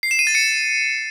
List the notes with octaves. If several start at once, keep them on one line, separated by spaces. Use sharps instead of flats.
C7
E7
D#7
A6
C#7